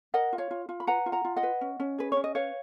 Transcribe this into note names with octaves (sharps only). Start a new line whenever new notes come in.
A#4 D#5 F#5
F4
C#5 F5
F4
F4
B5
B4 F#5 A#5
F4
F#5 A#5
F4
D#5 F#5
B4
C#4
C#4
G#4 B4
C#4 C#5
D#5
B4 C#5 F5